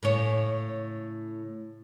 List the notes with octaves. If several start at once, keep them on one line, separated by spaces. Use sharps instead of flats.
A2 C#3 C#5